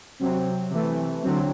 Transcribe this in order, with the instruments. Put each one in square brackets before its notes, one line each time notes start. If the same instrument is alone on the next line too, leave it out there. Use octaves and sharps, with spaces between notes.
[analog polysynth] C3 F#3 C4
C3 E3 A3
D3 F#3 C4